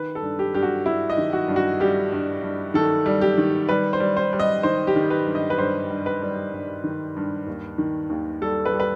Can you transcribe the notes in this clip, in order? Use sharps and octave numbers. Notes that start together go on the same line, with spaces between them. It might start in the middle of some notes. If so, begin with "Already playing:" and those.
Already playing: D#3 B4
A4
G2
G4
G2 G4
F#4
G2 E4
D#5
D#3
F#4
G2
F#4
G3 G4
G2
G2
D#3 A4
G3
G4
D#3
G3 B4
C5
G3
C5
G3
D#5
D#3 C5
G4
D#3
B4
G2
D#5
B4
G2 C5
G2
B4
G3
G2
D#3
G2
D#2
D#3
D#2
G3 A4
B4
G3
B4